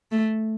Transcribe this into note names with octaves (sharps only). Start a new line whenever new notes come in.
A3